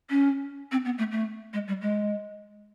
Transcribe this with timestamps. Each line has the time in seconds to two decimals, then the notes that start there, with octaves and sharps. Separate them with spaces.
0.10 C#4
0.72 C4
0.85 B3
0.98 A3
1.12 A3
1.53 G#3
1.68 G3
1.81 G#3